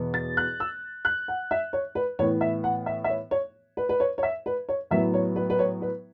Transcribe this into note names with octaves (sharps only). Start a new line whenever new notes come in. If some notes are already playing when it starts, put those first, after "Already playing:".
Already playing: E2 B2 B3
A6
F#6
E6
F#6
F#5
E5
C#5
B4
A2 E3 B3 C#5
E5
F#5
E5
E5
C#5
C#5
B4
B4
C#5
C#5
E5
B4
C#5
A2 F#3 B3 E5
C#5
B4
B4
C#5
B4